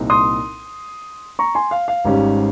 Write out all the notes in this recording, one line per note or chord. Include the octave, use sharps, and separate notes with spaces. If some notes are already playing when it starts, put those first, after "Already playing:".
Already playing: C2 A#2 G3 C4 D#4
C6 D#6
A#5 C#6
G#5 C6
F5
F5
G#1 G#2 G3 C#4